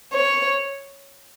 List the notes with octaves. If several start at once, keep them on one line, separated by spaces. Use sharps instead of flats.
C#5